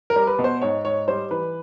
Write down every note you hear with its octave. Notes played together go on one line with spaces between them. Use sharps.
A#4
G3
B4
B2
C5
G#2 C#5
G#2 C#5
G3 C5
E3 B4